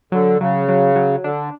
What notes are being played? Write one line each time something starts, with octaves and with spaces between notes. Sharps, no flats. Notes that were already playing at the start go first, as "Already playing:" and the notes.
D3 F#3
C#3 F#3
F#3
F#3
D3 D4